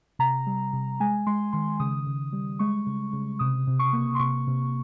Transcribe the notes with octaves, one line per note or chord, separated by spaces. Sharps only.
C3 A#5
G3
C3
G#3 G#5
G#3 C6
D#3 C6
C#3 D#6
C#3
G3
G#3 C#6
C#3
C#3
C3 D#6
C3
C#6
A#3
C6
C3 C#6
C3